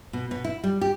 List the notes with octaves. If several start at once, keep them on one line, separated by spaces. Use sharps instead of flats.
B2
B2
E4
G3
G4